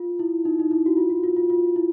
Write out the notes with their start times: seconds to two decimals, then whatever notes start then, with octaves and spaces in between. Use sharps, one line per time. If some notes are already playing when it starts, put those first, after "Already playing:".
Already playing: F4
0.19 E4
0.45 D#4
0.60 D#4
0.71 E4
0.86 F#4
0.97 F4
1.10 F#4
1.23 F4
1.37 F4
1.50 F4
1.76 E4